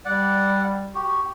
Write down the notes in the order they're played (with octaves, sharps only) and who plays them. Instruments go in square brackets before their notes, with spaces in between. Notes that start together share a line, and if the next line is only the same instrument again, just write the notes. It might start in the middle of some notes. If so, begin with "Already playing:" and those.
[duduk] G3 [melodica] D5 F#5
[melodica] F#4 G4